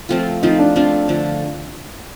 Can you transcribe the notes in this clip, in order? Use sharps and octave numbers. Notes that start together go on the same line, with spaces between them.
F3 A3 C4 F4
F3 A3 C4 D#4 F4
D4
F3 A3 C4 D4 F4
D3 F3 A3